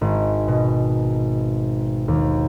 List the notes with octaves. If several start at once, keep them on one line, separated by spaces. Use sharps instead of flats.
G#1
B2
D#2